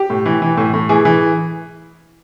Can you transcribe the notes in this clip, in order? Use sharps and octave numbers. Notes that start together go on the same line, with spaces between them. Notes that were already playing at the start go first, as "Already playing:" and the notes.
Already playing: G4
A2
E3
E3
A2
A2
E3 G#4
E3